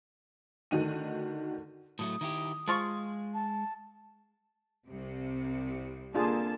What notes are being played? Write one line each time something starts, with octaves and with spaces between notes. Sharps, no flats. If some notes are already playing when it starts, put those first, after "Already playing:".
D2 D#3 F#4 D#7
A2 F#3 A3 D#6
D#3 E4 G4
F3 G#3 F4 C#6
A5
C2 C3
D3 A#3 D4 F4 G#4 A5